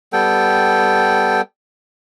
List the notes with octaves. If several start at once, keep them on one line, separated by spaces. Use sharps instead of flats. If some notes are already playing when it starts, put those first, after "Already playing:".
G3 B3 A4 G5